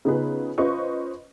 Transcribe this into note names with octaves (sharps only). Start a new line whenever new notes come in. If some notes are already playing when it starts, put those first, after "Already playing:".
C#3 B3 D#4 F4 G#4 B4
C#4 F4 B4 C5 D#5 C#6